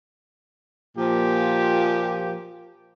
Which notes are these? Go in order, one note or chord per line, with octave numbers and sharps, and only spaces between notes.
A#2 F3 G4